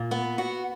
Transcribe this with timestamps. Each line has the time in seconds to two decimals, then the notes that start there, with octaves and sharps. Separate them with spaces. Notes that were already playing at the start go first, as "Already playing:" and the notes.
Already playing: A#2
0.11 B3
0.38 F#4